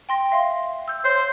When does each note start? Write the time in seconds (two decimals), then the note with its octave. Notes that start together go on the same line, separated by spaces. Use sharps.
0.09 G5 C6 A#6
0.32 E5 F5 C6
0.88 E6 G6
1.05 C5 C#5 C6